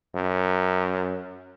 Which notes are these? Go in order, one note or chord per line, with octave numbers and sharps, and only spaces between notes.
F#2